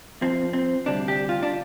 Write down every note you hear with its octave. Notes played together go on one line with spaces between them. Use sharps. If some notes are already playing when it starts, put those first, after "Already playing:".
F2 F3 C4
C4
D2 C3 G3 D4
G4
F4
D4